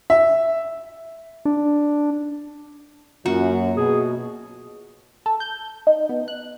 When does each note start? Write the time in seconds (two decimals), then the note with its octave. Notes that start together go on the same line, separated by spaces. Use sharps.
0.10 E5
1.45 D4
3.26 F#2 A#3 F4 F#4
3.77 B2 G#4
5.26 A4
5.40 G6
5.87 D#4
6.09 B3
6.28 F#6